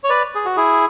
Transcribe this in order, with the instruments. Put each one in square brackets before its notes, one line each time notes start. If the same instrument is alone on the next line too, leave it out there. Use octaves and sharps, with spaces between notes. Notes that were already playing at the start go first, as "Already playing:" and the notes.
[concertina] C#5
B4 D5
G#4
F#4
E4 G#4